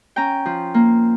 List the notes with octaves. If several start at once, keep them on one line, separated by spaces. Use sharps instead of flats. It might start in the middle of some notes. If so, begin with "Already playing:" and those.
C#4 G5 A#5
F3
A#3